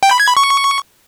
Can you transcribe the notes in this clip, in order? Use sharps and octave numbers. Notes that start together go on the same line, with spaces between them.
G5
B5
G#6
B5
C#6